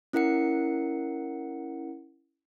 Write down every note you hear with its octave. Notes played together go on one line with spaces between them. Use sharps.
C#4 E4 A#4 F#5 C#7